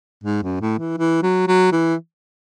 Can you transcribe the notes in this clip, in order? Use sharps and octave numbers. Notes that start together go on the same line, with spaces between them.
G#2
F#2
A2
E3
E3
F#3
F#3
E3